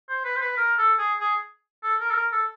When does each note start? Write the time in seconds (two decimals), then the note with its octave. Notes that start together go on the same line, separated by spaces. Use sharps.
0.09 C5
0.25 B4
0.36 C5
0.41 B4
0.57 A#4
0.78 A4
0.98 G#4
1.20 G#4
1.84 A4
2.00 A#4
2.11 A4
2.15 A#4
2.32 A4